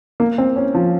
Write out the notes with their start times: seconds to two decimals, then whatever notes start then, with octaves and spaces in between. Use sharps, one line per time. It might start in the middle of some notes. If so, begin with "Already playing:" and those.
0.20 A#3
0.38 C4
0.56 C#4
0.75 F3